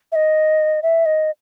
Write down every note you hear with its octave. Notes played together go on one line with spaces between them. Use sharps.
E5
D#5
E5
D#5